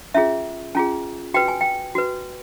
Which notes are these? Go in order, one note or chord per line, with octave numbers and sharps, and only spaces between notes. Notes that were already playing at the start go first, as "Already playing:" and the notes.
C#4 F4 G#4 E5
C#4 F4 G#4 G#5
F#4 B4 G5
G#5
G5
F#4 B4